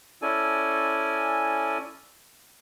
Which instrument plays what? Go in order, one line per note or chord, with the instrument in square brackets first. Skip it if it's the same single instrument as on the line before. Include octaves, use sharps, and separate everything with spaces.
[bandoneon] C#4 E4 A4 D5 G#5